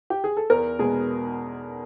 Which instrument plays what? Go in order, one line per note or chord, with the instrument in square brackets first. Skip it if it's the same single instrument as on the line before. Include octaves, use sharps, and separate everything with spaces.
[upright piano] G4
G#4
A4
E2 A#4
B2 G#3 B3 G#4